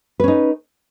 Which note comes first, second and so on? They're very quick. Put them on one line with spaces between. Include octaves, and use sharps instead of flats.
B4 C#4 D#4